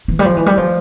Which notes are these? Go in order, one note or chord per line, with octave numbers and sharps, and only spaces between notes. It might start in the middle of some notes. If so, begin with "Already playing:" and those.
E3
G3
F3
E3
G3
F3